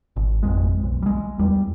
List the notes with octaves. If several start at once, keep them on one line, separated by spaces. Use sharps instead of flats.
G#1
G#1 F2 G#3
B1
G3 G#3
E2 G3